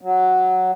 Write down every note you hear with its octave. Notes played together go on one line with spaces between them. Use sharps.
F#3